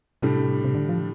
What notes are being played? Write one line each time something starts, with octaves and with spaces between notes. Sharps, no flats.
A2 C3 G3 D4 A4
C3
D3
F3